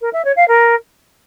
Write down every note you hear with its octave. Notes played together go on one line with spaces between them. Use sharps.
A#4
E5
C#5
F5
A#4